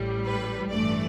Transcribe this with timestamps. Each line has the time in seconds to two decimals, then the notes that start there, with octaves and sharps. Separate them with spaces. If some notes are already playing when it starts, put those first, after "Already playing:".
Already playing: A1 A2 G3
0.25 B4
0.70 A1 G2 E3 A3 D5